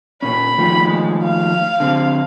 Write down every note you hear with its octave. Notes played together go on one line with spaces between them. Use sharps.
A#2 C#4 B5
D#3 F3 A3
G#3
F5
D3 C4